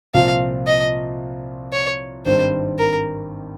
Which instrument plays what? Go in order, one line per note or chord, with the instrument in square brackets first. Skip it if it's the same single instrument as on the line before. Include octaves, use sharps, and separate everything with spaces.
[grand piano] C2 A#2 F3 C4 F4 [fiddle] F5
[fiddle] D#5
C#5
[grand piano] G#1 G2 D#3 G3 C4 [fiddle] C5
[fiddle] A#4